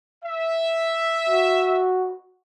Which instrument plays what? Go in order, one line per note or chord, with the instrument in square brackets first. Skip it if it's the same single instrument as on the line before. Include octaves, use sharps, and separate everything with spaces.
[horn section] E5
[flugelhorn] F#4